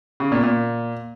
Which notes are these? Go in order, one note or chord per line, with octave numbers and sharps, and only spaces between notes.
C#3
A#2
A#2